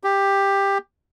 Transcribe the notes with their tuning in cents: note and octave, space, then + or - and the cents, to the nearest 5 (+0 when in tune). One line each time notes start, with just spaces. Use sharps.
G4 +10